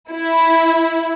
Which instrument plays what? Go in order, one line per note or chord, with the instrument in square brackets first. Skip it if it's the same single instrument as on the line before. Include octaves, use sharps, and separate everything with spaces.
[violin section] E4